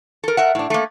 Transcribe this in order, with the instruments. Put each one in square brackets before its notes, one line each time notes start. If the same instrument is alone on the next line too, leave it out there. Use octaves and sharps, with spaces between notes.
[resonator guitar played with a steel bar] A4 A#4
A#4 E5 F#5
A2 D4
A3 A#3